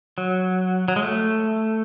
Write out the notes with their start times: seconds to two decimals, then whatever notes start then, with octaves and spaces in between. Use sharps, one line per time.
0.18 F#3
0.88 F#3
0.96 G#3
1.03 A3